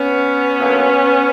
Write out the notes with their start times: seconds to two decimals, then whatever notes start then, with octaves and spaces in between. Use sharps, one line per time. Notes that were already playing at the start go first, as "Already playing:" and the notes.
Already playing: B3 C#4
0.60 D3 F#3 A#3